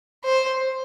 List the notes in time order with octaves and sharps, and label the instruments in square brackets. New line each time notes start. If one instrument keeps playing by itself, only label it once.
[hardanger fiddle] C5